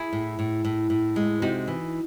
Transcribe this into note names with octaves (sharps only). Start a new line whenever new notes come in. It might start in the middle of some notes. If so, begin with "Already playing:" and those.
Already playing: E4 G#4
A2
A2
A2
A2
G#3
C3 D#4 F#4
E3